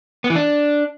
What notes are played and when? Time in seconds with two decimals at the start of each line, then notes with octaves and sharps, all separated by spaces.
0.24 B3
0.30 E3
0.36 D4